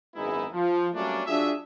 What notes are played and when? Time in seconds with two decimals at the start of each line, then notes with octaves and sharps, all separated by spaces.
0.15 G#1 F#2 G#3 B3 D#4 E4
0.53 F3
0.94 F#3 G3 A3 A#3 C#4 D4
1.27 F#3 D4 F4 F#4 G#4 E5